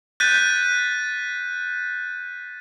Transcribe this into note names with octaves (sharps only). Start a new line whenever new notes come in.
F#6 G6 A6 B6 D#7